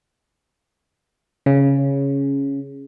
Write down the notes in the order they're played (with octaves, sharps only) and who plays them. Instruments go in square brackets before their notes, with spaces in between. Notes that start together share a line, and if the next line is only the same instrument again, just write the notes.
[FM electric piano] C#3